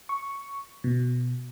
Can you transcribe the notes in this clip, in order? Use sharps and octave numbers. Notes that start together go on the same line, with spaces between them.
C#6
B2